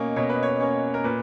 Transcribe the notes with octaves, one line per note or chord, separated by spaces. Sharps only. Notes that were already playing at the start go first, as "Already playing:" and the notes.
Already playing: B2 A#3 C#4 D#5
B2 C#5
B4
C#5
A#3 C#4
A#4
A#2 B4